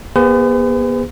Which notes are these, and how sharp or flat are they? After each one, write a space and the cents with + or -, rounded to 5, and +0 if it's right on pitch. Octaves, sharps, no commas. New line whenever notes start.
B3 -40 G#4 -30 B4 +45